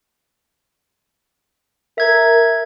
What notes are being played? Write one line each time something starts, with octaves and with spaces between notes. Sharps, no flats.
A#4 E5 G#6